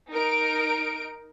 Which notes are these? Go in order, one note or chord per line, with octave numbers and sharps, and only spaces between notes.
D#4 A#4 D7